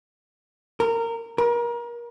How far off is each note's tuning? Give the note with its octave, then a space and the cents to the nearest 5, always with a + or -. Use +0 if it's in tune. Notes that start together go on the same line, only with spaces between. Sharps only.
A#4 -20
A#4 +30